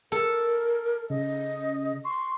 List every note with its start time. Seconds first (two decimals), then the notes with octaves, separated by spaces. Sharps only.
0.12 A4 A#4
1.10 C#3 D#5
2.04 C6 C#6